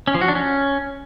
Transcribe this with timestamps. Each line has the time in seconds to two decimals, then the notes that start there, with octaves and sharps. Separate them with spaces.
0.07 C#4
0.14 F3
0.21 F#4
0.28 D4
0.35 C#4